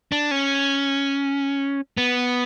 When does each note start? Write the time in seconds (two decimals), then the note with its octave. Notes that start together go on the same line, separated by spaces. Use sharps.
0.12 D4
0.31 C#4
1.97 B3